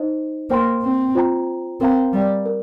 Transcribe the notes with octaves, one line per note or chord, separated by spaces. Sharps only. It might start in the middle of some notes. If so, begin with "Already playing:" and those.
Already playing: D#4 C5 D#5
A#3 C5 G5 C6
C4
F4 C5 G5 A#5
C4 A#4 F5 A#5
G3
A#4